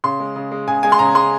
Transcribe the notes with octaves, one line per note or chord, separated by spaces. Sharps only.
C#3 C6
G#3
C#3
G#3
C#3 G#5
G#3 G#5
C6
C#3 A#5
G#3 C6